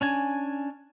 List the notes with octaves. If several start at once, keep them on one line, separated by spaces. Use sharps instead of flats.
C#4 D4 G#5